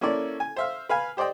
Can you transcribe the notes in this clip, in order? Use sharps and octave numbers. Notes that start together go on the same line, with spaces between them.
A#3 C#4 E4 A4 D5
G#5
C5 E5 F5
B4 F5 G#5
G4 C5 D5 D#5 G5